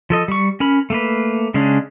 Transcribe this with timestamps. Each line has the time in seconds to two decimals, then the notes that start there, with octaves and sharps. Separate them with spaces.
0.10 F3 A4 D#5
0.28 G3 C#6
0.60 C#4 A#4 B5
0.90 A3 A#3 B4
1.54 C#3 G#3 C#4 D4